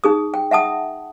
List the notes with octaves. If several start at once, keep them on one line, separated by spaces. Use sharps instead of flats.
D#4 G#4 D#6
G5
E5 F#5 A5 D#6